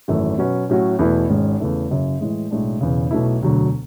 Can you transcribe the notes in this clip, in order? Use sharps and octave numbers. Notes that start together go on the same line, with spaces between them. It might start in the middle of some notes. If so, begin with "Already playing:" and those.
G#1 F#2 E3 A3
B2 F#3 C#4 F#4 B4
A2 F#3 C#4 F#4
E2 B2 A3 E4 B4
G#1 G#2 G#3 C#4
E2 C#3 E3 A3
F#1 F#2 C#3
A2 E3 G#3
B1 A2 G#3 D4
E1 E2 C#3
B1 B2 A3 E4
E1 D2 D3 F#3